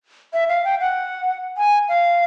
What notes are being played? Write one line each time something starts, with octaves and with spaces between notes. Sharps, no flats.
E5
F5
G5
F#5
G#5
F5